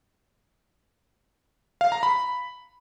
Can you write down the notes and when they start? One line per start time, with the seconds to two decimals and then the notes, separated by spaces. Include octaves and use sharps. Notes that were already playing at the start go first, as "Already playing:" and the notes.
1.81 F5
1.92 A#5
2.03 B5